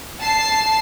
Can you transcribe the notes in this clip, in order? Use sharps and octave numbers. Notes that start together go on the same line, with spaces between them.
A5 C7